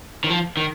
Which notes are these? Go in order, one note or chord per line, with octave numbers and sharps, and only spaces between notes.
D#3
F3
D#3